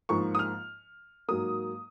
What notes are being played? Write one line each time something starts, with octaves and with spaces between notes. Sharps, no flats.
G#2 F3 A#3 C#6
D#6
F6
G#2 F#3 A#3 D#6